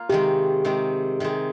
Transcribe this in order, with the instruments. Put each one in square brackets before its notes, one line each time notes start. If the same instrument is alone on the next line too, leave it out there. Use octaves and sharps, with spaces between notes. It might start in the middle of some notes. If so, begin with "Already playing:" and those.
Already playing: [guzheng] A#3 F4
[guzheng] C3 D#3 G#3 [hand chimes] G4
[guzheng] C3 D#3 G#3
C3 D#3 G#3